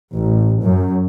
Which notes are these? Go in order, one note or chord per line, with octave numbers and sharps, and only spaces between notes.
A1
F#2